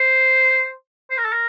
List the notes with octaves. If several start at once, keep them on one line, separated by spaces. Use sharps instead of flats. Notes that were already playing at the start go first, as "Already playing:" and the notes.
Already playing: C5
C5
A#4
A4
A#4